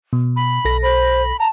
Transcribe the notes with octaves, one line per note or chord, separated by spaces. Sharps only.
B2
B5
B1 A4 A#6
C5 B5
A5 A#5